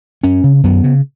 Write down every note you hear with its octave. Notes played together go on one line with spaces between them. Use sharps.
F#2 C#4
C#3
F#2 B3
C#3